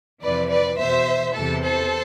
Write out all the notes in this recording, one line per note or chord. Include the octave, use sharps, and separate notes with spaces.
F2 C3 E3 B4 D5
B4 D5
E2 B2 C5 E5
E2 C3 E3 A4
A4 C5